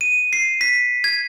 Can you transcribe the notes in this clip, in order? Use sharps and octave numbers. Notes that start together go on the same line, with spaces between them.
D#7
C7
B6
G#6